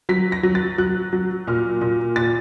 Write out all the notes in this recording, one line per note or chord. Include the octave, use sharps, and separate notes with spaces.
F#3 B6
A#6
F#3
A6
F#3 F#6
F#3
A#2 F6
A#2
A#2 A6